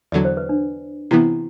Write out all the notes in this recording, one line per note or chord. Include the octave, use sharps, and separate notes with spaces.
E2 D3 F#3 D5
C5
B4
D4
C3 E3 B3 E4